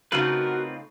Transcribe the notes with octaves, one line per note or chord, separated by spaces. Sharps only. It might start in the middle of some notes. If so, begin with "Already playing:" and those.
C#3 A3 C4 D#4 F4 F#4 A#4 B4